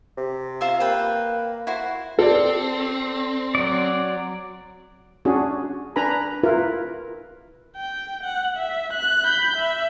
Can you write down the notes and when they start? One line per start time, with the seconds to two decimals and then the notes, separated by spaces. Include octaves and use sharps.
0.17 C3
0.61 F4 C5 E5
0.80 A#3 B4 G5
1.67 E4 F#4 C5
2.19 C4 A4 D5
3.55 F#3 D5
5.25 C#4 D4 F#4 G#4
5.96 D4 B4 G#5 A#5 B5
6.43 E4 F4 A#4 B4
7.76 G5
8.23 F#5
8.57 E5
8.93 F#6
9.25 B5 G6
9.57 E5